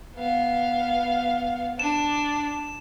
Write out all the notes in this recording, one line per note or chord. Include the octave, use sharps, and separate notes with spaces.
B3 F5
D4 E7